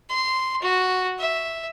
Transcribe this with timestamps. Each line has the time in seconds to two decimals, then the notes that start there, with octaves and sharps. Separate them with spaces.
0.10 C6
0.62 F#4
1.19 E5